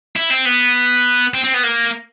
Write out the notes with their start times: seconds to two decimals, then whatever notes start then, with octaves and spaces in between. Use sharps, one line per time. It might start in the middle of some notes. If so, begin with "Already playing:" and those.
0.16 E4
0.31 C4
0.46 B3
1.34 C4
1.44 C4
1.54 B3
1.63 A#3